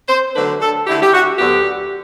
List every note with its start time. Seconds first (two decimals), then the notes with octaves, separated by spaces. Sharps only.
0.09 C5
0.35 D3 F#3 A3 D4 B4
0.61 A4
0.87 D3 A3 E4 G4
1.02 G4
1.13 F#4
1.38 D2 D3 F#3 B3 G4